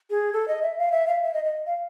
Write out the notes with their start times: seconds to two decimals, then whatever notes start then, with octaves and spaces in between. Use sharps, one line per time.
0.10 G#4
0.33 A4
0.48 D#5
0.62 E5
0.78 F5
0.92 E5
1.08 F5
1.23 E5
1.34 D#5
1.45 D#5
1.67 F5